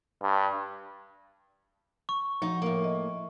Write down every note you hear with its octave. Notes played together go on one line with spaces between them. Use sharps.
G2
C#6
F3 D#4 F#4
A2 A#3
D#5